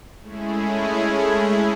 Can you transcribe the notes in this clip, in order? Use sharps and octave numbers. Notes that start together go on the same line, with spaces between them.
G#3 A3 C#4 E4 G#4